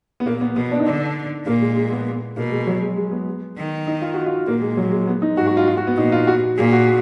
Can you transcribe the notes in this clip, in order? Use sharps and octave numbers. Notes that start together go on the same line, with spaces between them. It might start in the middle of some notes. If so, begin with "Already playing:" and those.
B3
A#2 A#3
B3
B2 B3
D4
D#4
D3 D4
A#2 A#3
G#3
G#3
B3
B2 A#3
G#3
F#3
G#3
G#3
B3
D#3
D#4
F4
F#4
F4
A#2 A#3
G#3
F#3
G#3
B3
D#4
G#2 F#4
F#4
F4
F4
F#4
B3
A#2 D#4
F4
F#4
A#2 G#4
F#4